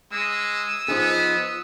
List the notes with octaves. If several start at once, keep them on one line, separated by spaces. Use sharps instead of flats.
G#3 D#6 E6
F3 B3 D#4 G#4